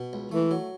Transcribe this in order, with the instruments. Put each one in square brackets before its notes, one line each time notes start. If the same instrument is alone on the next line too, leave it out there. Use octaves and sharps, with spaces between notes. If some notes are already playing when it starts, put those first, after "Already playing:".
Already playing: [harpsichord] B2
C#2
[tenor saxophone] E3 [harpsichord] A3
[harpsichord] F#3